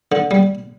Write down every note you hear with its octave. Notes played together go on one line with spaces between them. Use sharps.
D3
G3